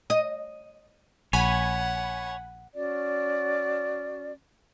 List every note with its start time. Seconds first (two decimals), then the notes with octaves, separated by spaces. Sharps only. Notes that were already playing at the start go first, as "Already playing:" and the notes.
0.10 D#5
1.33 A#1 C#5 F#5 G#5 B5
2.73 C#4 F#4 D5